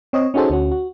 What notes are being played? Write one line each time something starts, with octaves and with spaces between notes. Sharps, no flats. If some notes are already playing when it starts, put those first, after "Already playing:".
C4 C#5 D#5
C#4 D#4 F#4 G#4 A4 C5
D2 C#4 F#4
F#4